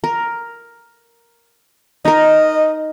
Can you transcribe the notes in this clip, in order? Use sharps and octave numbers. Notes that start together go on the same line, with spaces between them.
A#4
D#4 A#4 D#5